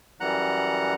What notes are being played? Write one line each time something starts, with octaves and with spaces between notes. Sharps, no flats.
F#2 E3 G3 F#5 A#5 F#6